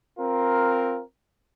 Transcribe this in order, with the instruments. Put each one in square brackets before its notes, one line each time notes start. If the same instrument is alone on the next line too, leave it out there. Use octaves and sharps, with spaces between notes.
[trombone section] C4 F4 A#4